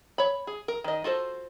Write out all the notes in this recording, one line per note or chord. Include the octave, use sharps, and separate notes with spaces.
C#5 B5
G#4
A#4
D#3 D#5
F4 F#4 A4 C5